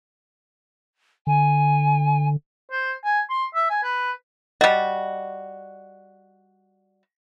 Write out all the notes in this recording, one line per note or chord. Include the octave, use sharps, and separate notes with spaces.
D3 G#5
C5
G#5
C6
E5
G#5
B4
G3 F#4 D#5